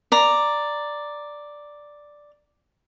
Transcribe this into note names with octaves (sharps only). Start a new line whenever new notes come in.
D5 A#5